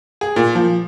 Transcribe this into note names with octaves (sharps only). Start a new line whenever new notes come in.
G#4
A#2
F3